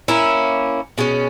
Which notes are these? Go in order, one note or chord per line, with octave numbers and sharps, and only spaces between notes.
A#3 C#4 E4
B2 G#3 C#4